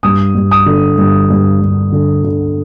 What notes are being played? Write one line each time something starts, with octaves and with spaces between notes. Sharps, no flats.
G2 D#6
G2
D#6
D3
G2
G2
G2
D3
D3